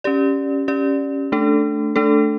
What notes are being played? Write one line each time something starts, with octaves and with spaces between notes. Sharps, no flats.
C#4 G4 D5
C#4 G4 D5
A3 D4 A4
A3 D4 A4